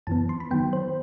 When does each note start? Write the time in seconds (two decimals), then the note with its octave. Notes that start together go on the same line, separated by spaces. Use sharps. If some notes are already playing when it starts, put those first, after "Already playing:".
0.07 F#2 E3 B3 A5
0.29 C6
0.40 B5
0.51 D#3 F#3 B3 G5
0.73 C5